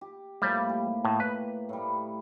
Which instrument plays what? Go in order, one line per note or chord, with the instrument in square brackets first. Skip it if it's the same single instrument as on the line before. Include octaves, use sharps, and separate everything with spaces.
[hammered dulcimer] G4
[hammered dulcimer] A2 F3 A#3 [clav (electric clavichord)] G3
[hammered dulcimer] G4
[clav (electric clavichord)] A2
B4
[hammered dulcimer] A2 G3